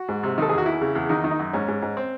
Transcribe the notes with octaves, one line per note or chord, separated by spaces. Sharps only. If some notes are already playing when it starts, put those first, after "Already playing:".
Already playing: F#4
G#2
C3
D#3 A4
E2 G#4
F#4
E3 E4
C#3
E2
D#3 D#4
D#3
D#4
F#2
G#2 C#4
G#2
G#2
C4